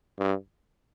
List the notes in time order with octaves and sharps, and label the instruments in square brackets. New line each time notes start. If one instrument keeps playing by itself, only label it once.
[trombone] G2